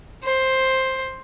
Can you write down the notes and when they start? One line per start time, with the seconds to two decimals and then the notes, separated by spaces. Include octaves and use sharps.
0.23 C5